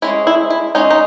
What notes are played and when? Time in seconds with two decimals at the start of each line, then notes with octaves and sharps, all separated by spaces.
0.02 G#3 C#4 E4
0.27 E4
0.50 E4
0.75 G#3 C#4 D#4
0.90 D#4